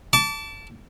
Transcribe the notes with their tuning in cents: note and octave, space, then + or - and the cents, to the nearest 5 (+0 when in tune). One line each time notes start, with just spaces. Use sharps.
A5 +5 D6 -30